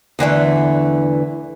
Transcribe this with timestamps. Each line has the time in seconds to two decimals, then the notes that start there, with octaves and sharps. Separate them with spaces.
0.19 E2 D3 E3 A3